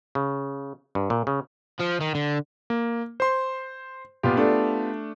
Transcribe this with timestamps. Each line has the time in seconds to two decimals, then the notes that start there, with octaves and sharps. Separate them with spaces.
0.15 C#3
0.95 G2
1.10 A#2
1.27 C#3
1.79 F3
2.01 D#3
2.15 D3
2.70 A#3
3.20 C5 C6
4.23 A#2 B3 F4 G4
4.37 A3 D4